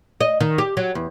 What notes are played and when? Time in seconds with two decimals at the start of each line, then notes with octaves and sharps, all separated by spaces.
0.21 D#5
0.41 D#3
0.58 G4
0.77 F#3
0.95 E2